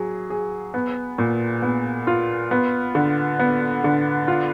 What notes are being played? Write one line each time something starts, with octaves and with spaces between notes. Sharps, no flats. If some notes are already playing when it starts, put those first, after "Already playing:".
Already playing: F#3 G#4
G#4
B3
A#2
B3
F4
B3
D3
B3
D3
F4